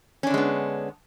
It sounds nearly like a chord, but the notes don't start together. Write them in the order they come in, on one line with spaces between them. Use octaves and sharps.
C#4 D4 D3 G#3 B3